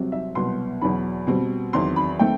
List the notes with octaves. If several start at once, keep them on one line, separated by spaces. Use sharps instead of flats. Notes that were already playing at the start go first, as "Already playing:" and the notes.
Already playing: C2 C3 F#3 C4
E5
C2 B2 F#3 B3 C6
E2 B2 F#3 B5
B2 G3 C4
E2 D#3 F#3 C4 C6
B5
D#3 A3 C4 G5